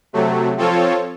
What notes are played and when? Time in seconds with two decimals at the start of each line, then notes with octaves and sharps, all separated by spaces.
0.13 C3 F#3 A3
0.57 F3 C4 F4 A4 C#5